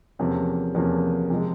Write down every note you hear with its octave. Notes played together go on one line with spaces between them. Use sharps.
E2 C3 F3 A#3 C#4
E2 C3 F3 A#3 C#4
C3 F3 G#3